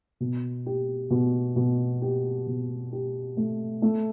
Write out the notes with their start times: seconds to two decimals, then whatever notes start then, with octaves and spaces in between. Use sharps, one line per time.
0.20 B2
0.66 G4
1.10 B2
1.56 B2
2.02 G4
2.47 B2
2.92 G4
3.37 A3
3.82 A3